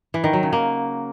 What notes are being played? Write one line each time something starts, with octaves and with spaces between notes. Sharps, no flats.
E3
D#3
F#3
C#3
A#3